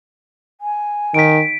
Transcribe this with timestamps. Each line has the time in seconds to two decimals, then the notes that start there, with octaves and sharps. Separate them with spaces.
0.61 G#5
1.14 D#3 B6 D7